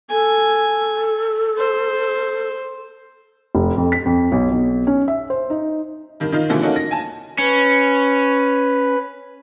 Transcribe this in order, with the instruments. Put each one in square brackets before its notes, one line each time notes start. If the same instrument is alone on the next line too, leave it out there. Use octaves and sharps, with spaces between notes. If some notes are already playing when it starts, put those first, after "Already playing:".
[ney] A4 [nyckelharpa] G#5
[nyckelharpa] C5
[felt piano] F1
F2
B6
F2
B1
B1
C#4
E5
C5
D#4
[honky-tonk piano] G2 D#3
D#3 D#4 F4
B2 D3 E3 F3 A3
A#3 C#4 D#4 F#4 A4
A#6
G#5 A5
[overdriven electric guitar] C#4 [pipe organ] B4